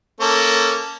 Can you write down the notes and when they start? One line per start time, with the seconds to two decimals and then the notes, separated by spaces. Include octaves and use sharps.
0.20 A#3 C#4 A4